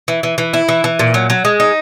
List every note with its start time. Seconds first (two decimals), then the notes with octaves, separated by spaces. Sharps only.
0.08 E3
0.23 E3
0.38 E3
0.54 E4
0.69 E3
0.84 E3
0.99 A#2
1.14 F#3
1.30 F#3
1.45 G#3
1.60 D#4